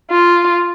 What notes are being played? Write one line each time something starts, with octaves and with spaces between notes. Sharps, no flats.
F4